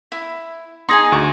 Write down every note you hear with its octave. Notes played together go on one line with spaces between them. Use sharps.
E4
D#4 G#4 G#5 C6 D#6 A#6
D2 C#6